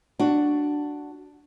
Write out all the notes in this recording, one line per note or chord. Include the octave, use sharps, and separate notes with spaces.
D4 F#4